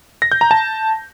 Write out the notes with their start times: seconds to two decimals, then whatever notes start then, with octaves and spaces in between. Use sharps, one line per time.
0.22 A#6
0.32 G6
0.41 A#5
0.51 A5